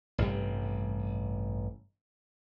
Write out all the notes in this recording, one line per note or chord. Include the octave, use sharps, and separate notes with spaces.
A1 G2 C3 G3